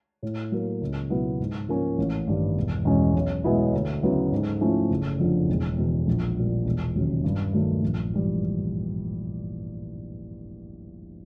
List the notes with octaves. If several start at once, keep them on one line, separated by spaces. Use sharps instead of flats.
A2
F#3 A#3
C#2
B2 F#3 B3 E4
G#2
F3 A#3 C#4
A1
G2 D#3 G3
E1
E2 B2 G#3 C#4
B1
B2 G#3 B3 E4
D2
C#3 F#3 B3 E4
G#2
F3 A3 C#4 E4
F#1
F2 D3 F3
E1
E2 B2
A#1
A#2 G3
E1
D#2 C#3 F#3
G2
D#3 F#3 A3
A#1
G#2 E3 G3